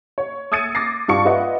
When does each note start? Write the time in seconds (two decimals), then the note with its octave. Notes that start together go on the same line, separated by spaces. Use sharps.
0.18 C#5
0.52 D#6 E6 G#6 A6 C#7 D#7
0.75 D6 A6 A#6 C7
1.08 G2 F4 C#6 C#7
1.25 F4 B4 D#5 E5 F#5